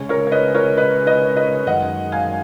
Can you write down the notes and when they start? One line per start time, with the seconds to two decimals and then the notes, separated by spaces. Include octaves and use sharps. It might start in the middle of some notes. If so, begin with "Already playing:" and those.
Already playing: C#3 G#3 C#4
0.09 A#4 C#5
0.27 C#5
0.31 B4 D#5
0.54 A#4 C#5
0.77 B4 D#5
1.06 B4 D#5
1.36 B4 D#5
1.66 F#2 D#3 G#3 D#5 F#5
2.12 F5 G#5